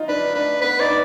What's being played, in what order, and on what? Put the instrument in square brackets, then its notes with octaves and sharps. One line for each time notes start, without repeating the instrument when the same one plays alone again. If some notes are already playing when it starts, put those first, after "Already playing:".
Already playing: [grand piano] D#4 F4
[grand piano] D4 [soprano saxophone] B4
[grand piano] D4 [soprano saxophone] B4
[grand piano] B3 [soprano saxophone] B4
[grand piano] D#4 [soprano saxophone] D5